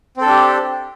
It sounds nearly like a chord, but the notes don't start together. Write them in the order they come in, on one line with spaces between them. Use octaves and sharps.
C4 A4 D4 G4